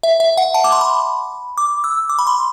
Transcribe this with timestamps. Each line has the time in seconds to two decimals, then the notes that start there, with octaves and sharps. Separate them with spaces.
0.03 E5
0.20 E5
0.37 F#5
0.54 A5
0.64 D6
0.72 C6
0.81 B5
1.58 D6
1.84 E6
2.09 D6
2.19 B5
2.27 C6